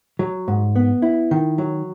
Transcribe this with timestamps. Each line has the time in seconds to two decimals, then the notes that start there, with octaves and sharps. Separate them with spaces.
0.19 F#3
0.48 G#2
0.76 B3
1.02 E4
1.31 D#3
1.58 F#3